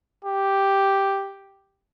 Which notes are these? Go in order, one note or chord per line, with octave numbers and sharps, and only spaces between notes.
G4